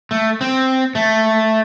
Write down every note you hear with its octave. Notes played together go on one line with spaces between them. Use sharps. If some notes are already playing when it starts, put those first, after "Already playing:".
A3
C4
A3